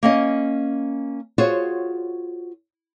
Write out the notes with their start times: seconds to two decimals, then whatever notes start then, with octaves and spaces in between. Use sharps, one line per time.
0.03 A#3 C#4 D#5
1.38 F4 F#4 G#4 C5 C#5